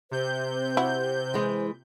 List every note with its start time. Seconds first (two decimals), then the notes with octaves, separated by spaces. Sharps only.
0.11 C3 C5 G6
0.77 E4 F#4
1.34 E3 G#3